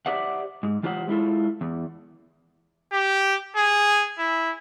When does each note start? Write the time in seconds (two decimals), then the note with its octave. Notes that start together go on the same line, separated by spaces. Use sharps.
0.06 G4 C5 D5 E5 F#5
0.63 G#2
0.83 E3 F4 G4 C5 F#5
1.08 G#3 E4 F4 A4
1.61 E2
2.92 G4
3.57 G#4
4.19 E4